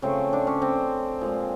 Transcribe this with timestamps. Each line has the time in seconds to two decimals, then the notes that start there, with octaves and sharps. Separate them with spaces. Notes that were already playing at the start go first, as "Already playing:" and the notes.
0.02 C#3 F3 A3 C4
0.33 D4
0.47 C#4
0.62 C4
1.21 A#2 F3 G#3